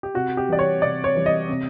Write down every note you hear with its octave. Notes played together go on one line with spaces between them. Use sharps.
G4
C3 F#4
G4
E3 G3 D5
C#5
C3 D5
C#5
E3 G3
D#5
C3